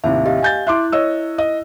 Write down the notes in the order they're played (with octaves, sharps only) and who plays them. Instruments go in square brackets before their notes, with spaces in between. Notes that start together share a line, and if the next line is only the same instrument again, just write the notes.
[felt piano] D#2 A2 C3 [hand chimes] E5
[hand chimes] G4 D#5 F5
[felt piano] G#5 G6 A6
[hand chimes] E4 F#6 [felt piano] E5 C6 D6
[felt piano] C#5 D#5 E6
D#5